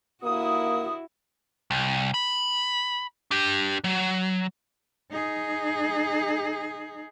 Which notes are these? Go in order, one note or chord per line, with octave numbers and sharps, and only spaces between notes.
D#2 D3 A#3 E4 F#4 D#6
C2
B5
D4 G4
F#3
D#4 G#4